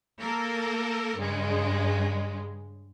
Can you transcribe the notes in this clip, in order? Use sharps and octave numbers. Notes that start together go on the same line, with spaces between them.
A#3 A4 A#4
G2 C#3 G#3